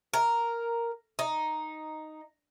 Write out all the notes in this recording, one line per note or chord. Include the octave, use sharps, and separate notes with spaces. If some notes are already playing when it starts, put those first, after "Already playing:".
A#4
D#4